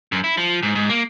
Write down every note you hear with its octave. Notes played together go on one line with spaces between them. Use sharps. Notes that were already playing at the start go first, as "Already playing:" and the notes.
F#2
E4
F3
G#2
G#2
A#3